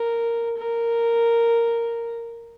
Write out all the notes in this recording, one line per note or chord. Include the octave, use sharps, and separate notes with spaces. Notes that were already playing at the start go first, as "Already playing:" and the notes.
Already playing: A#4
A#4